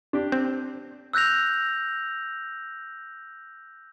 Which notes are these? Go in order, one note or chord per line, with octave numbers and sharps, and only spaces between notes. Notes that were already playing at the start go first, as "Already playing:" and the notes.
D4 G4
C4
E6 F#6 G6 A#6 F7